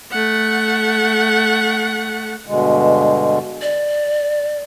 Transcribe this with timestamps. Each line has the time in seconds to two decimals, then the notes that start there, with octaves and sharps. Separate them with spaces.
0.11 A3 F#5
2.47 G2 B2 D3 G#3
3.62 D5